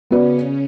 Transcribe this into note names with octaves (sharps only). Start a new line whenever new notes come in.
C#3 B3 C#4 F#4 B4 D5